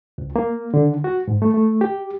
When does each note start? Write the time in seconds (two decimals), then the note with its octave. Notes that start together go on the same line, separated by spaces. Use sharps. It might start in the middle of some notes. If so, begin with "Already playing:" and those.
0.18 C#2
0.36 A#3
0.74 D3
1.04 F#4
1.28 G#2
1.42 A3
1.54 A3
1.81 G4